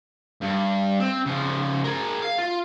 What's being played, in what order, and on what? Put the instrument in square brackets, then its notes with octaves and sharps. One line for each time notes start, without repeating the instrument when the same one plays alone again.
[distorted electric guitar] G2
C4
C#3 F3
G#4 A#4
F5
F4